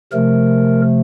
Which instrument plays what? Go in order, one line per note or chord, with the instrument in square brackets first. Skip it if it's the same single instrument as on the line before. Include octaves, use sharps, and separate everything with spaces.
[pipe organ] C3 F3 A3 A#4